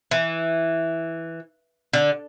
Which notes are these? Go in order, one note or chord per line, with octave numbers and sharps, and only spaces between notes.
E3
D3